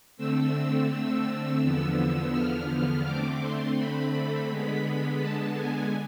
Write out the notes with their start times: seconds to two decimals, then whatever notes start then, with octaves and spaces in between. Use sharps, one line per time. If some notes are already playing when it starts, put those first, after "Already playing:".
0.17 D3 A3 C4 E6
0.89 E6
1.61 E2 D3 F3 B3
2.33 F6
3.04 D3 A3 C4 D6
3.41 C6
3.76 B5
4.13 B5
4.49 D3 G#3 B3
5.20 A5
5.56 G#5